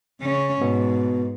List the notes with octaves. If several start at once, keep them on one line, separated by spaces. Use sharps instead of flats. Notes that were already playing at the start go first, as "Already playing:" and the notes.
C#3 C#4
G#2 B2